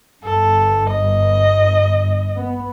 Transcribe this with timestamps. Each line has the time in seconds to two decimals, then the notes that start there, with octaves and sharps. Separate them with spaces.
0.24 G1 G2 A4
0.90 D#5
2.37 B3